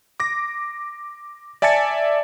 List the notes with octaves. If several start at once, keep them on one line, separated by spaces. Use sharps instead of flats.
D6 A#6
D5 E5 G#5 A5 A6 C#7